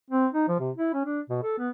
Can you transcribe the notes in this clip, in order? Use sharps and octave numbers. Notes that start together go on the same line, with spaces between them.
C4
D#4
F3
C3
E4
C#4
D4
B2
A4
B3